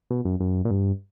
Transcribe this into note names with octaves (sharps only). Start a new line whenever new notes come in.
B2
F#2
F#2
A#2
G2